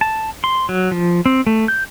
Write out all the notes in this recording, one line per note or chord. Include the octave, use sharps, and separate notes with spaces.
A5
C6
F#3
F3
C4
A3
G6